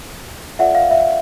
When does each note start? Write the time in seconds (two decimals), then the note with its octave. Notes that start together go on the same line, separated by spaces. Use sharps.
0.59 F4 A4 D5 E5 F#5
0.75 F5
0.91 E5